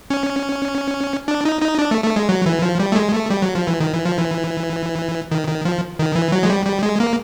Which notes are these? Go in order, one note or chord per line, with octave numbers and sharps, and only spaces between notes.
C#4
D4
D#4
D#4
D4
A3
A3
G#3
F#3
E3
F3
G3
A3
G#3
A3
G3
F#3
F3
E3
D#3
E3
F3
E3
D#3
D#3
F3
D#3
E3
F#3
G#3
G3
G3
G#3
A#3